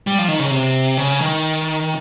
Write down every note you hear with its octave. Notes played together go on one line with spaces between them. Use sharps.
G3
F3
D#3
C#3
C3
C#3
D#3